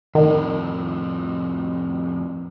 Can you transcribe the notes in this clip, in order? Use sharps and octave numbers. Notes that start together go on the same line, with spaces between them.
F2 A2 D#3